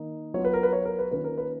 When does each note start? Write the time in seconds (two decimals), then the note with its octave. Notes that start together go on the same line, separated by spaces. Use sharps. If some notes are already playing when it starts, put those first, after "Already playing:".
Already playing: D#3 A#3 D#4
0.34 F#3 C#5
0.37 B3 F4
0.45 B4
0.53 A#4
0.63 B4
0.73 C#5
0.85 A#4
0.99 B4
1.11 D#3 A#3 C#4 F4 B4
1.24 A#4
1.38 B4